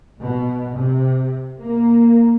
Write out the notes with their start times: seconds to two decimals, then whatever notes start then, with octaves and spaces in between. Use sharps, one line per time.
0.19 B2
0.75 C3
1.61 A#3